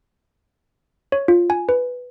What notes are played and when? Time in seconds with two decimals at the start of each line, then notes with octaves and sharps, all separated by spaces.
1.12 C#5
1.28 F4
1.50 G#5
1.69 B4